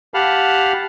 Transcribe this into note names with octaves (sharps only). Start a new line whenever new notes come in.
G4 F5 F#5 A5 B5 F6